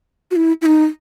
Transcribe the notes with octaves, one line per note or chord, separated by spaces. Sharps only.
F#4
E4
E4
D#4